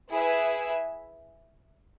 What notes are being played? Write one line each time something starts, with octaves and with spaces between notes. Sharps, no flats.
E4 G#4 B4 E5 G#5